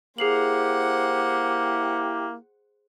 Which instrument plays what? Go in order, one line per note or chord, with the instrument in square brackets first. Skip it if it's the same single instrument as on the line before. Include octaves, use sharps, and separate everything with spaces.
[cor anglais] A#3 [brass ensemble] E4 G4 [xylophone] G#4 C7 F#7 [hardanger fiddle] C5 F#5